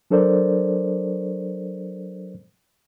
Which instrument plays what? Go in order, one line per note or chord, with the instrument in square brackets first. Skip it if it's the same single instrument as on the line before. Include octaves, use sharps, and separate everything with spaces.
[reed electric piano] F#3 D4 A4 A#4 C5 D5